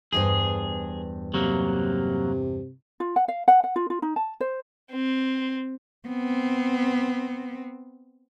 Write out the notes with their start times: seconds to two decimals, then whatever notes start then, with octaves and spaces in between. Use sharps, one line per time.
0.12 E2 G2 G#4 C5
1.34 C3 F#3 A#3
3.00 F4
3.16 F#5
3.28 F5
3.48 F#5
3.64 F#5
3.76 F4
3.90 F4
4.02 D#4
4.16 A5
4.41 C5
4.91 C4
6.08 B3 C4